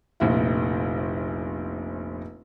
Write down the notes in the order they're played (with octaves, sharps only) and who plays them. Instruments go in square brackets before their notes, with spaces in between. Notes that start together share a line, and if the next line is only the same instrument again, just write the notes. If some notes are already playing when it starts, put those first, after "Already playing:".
[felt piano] F1 A#1 E4